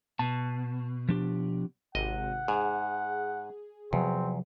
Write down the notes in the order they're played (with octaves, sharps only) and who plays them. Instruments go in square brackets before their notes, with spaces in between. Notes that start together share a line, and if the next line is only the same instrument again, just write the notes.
[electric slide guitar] B2 [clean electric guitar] A5
[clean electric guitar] F3 D4 G4
[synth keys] G#1 C3 [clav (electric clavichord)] D#5 [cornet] F#5
[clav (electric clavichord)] G#2 [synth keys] G#4
[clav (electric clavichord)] E2 [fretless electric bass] C3 F3 F#3 [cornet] C4